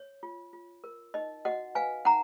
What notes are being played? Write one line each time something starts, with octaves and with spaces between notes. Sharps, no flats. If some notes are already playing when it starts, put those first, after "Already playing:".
Already playing: C#5
F4
F4
A#4
D#4 D#5
F#4 D#5 F#5
B4 F5 G#5
D#4 F#5 A#5